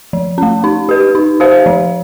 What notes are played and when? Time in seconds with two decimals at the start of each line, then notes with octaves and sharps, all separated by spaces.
0.13 F3
0.38 A3 C#4
0.64 D#4
0.89 G4 B4
1.15 D#4
1.40 G4 C5 F5
1.66 F3